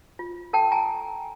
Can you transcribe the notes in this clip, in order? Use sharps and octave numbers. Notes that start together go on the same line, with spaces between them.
F4
A4 G5 A5
G#5 A#5